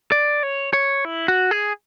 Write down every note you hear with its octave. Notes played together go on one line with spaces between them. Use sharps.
D5
C#5
C#5
E4
F#4
G#4